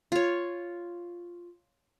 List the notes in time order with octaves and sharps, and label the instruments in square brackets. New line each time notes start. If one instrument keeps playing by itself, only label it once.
[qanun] F4 C#5